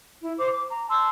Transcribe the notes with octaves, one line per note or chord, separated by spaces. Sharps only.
E4
C5 D6
D6
A#5
A5 C6 E6